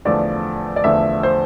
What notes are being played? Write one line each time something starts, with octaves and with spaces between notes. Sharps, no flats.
E2 D3 F3 A3 D5
D5
E2 D3 F3 A3 E5
C5